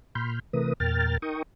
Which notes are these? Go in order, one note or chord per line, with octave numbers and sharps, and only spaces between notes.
A#2 B5 C6 F6 G6
C3 E3 A3 A#4 B4 D#6
E2 A#2 A#4 G5 F6 A6
D#4 A#4 G5 C#6 D#6